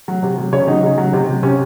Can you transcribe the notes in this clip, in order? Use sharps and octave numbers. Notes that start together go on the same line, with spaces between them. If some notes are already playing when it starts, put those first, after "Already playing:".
F#3
C3
F#3
C#3 C#5
F#3 D#4
C#3
F#3
C3
F#3
C3 C#4